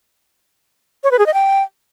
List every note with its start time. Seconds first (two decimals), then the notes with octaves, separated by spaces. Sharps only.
1.04 C#5
1.11 B4
1.19 G#4
1.26 D#5
1.34 G5